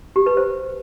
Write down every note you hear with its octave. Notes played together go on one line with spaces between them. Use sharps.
G4
B4
C5